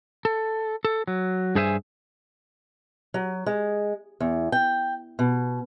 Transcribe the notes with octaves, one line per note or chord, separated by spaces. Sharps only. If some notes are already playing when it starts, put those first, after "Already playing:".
A4
A4
F#3
G2 G#4 C5 E5 G#5
F#3
G#3
E2
G5
B2